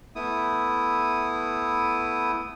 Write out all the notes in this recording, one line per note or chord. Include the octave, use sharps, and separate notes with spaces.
A3 B3 E4 D#6